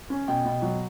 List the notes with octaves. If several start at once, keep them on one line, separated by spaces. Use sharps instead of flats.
C#4
B2 G5
B2
F#3